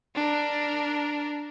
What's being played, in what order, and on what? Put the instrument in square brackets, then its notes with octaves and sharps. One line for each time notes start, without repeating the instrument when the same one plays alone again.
[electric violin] D4 A#4